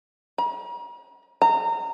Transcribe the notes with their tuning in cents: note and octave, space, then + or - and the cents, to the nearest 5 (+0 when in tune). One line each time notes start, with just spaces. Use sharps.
A#5 +45
A#5 -25